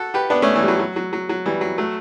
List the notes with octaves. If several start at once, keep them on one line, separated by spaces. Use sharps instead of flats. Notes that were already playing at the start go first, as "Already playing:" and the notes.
Already playing: F#4 A4
G4 B4
B3 D4
A3 C#4
E3
G3
F#3
F#3
F#3
F#3
F#3
E3 G3
F#3
F#3 A3